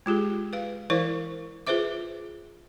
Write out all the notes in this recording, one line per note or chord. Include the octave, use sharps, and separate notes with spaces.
G#3 F4 G4 G#4
B4 F5
E3 E4 A#4 C5 F5 C#6
F4 G#4 B4 C5 E5 D6